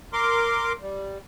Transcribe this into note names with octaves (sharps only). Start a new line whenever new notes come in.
A#4 C6 D6
G3